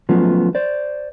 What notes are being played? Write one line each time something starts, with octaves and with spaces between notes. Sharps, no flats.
F3 F#3 A3 B3 C#4 F4
C5 D5